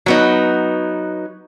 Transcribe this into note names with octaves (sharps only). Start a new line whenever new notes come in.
F#3 B3 D#4